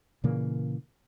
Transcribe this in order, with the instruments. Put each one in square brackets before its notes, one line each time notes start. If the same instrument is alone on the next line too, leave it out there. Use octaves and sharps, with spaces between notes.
[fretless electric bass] A#2 C#3 E3 A#3